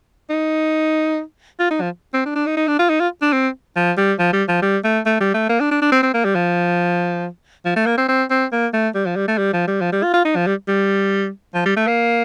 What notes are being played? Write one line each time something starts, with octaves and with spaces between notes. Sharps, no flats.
D#4
F4
D#4
F3
C4
D4
D4
D#4
D#4
D4
F4
D#4
F4
D4
C4
F3
G3
F3
G3
F3
G3
A3
A3
G3
A3
A#3
D4
D4
D4
C4
C4
A#3
G3
F3
F3
A3
A#3
C4
C4
C4
A#3
A3
G3
F3
G3
A3
G3
F3
G3
F3
G3
F4
F4
D#4
F3
G3
G3
F3
G3
A3
A#3